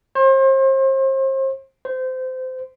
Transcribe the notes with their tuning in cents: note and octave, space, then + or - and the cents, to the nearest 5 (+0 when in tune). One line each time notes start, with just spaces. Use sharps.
C5 +35
C5 -25